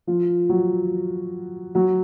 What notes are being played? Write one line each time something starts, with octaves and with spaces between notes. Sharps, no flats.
F3 F4
F#3 F#4
F#3 F#4